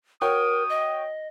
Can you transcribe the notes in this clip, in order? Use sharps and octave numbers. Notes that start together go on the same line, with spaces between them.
F#4 A#4 C#5 G5 D#6
D#5